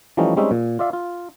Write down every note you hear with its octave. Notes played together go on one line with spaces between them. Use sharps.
E3 F3 G3 A3 C#4 D#4
G3 G#3 C4 C#4 D#4 E5
A#2
F4 D5 E5 F5
F4